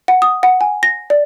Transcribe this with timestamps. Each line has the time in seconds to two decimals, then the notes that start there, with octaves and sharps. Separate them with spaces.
0.08 F#5
0.22 D#6
0.43 F#5
0.61 G#5
0.83 A#6
1.10 D5